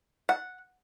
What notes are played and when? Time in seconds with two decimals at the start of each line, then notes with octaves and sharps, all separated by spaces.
0.29 F#5